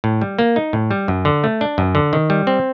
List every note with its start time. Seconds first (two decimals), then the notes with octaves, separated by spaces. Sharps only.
0.04 A2
0.22 G3
0.39 A#3
0.56 D#4
0.73 A2
0.91 G3
1.08 F#2
1.25 D3
1.44 A3
1.61 D4
1.78 F#2
1.95 D3
2.13 D#3
2.30 G3
2.47 C4